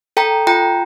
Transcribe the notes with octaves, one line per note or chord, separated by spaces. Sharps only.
A4 G5 A#5
F4 G5 A#5